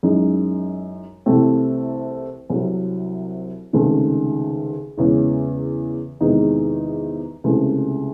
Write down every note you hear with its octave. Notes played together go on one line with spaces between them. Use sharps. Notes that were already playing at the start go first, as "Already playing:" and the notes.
F#2 E3 G#3 D#4
C2 C3 E3 A3 C4
C2 C3 F#3
C#2 C3 D#3 A3
E2 C#3 E3 G#3
E2 C3 D#3 G#3 D#4
C#2 C3 E3 A3